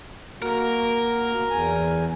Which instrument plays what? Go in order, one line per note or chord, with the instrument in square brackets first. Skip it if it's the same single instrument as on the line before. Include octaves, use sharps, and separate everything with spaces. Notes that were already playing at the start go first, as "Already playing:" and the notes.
[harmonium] A#3 F#4 [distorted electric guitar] A#4
[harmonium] E2 G#5